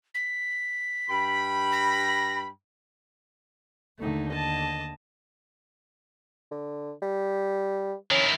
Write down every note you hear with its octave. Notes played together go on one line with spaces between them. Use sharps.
B6
G2 G5 B5
A#6
D#2 D3 A3 D#4
D#5 A5
D3
G3
D#3 C#4 E4